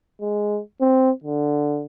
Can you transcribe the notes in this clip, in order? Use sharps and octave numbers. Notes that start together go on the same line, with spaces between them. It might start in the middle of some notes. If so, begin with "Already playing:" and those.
G#3
C4
D3